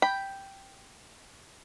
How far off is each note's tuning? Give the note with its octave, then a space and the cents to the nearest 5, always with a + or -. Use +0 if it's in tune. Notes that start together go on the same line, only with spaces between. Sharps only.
G5 +0 B5 +0